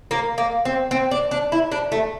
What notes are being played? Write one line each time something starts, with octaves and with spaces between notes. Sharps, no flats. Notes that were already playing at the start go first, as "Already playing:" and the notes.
A#3
A#3
C4
C4
D4
D4
E4
D4
A3